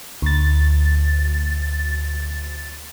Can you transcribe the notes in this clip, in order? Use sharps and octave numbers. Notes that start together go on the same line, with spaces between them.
D2 A6